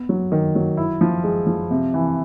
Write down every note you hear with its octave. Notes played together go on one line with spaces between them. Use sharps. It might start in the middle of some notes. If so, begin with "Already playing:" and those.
Already playing: B3
F#3
D#3
F#3
E4
F3
G#3
F3
C3
E3